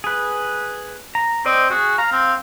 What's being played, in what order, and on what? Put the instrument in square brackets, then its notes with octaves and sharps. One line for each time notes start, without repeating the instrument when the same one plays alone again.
[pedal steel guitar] G#4 B4
A#5
[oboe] C4 [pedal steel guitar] C5 D5 D#5
[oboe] F#4 [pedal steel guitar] G#4
[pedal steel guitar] F5 [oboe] A#5
[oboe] C4